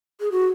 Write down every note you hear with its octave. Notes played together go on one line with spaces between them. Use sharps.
G#4
F#4